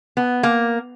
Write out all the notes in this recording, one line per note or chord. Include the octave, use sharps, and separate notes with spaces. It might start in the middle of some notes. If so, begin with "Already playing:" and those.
B3
A#3